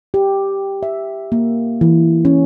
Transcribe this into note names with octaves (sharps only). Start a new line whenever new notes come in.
G4
E5
A#3
E3
C#4